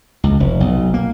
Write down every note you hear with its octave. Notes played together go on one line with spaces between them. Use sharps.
C#2
F1
B1
A#3